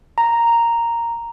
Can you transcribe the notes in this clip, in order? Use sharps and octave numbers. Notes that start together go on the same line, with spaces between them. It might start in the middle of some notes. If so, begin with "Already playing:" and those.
A#5